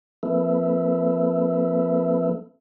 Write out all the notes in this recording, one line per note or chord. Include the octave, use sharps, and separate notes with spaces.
F3 A#3 C4 A4 B4 E5